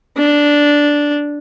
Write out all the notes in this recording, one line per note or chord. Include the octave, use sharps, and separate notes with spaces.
D4